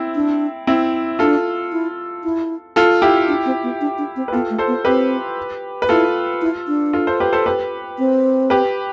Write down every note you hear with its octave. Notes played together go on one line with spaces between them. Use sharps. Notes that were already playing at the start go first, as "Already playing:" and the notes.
Already playing: C4 E4
D4
C4 E4
D4 F4 A4
E4
E4
F4 A4
E4 G4
D4
C4
B3
D4
D4
C4
B4
B3 F4 A4
A3
A4 C5
B3
C4 G4 B4
B4
E4 F4 A4
E4
D4
F4 A4
A4 C5
G4 B4
A4 C5
G4 B4
C4
G4 B4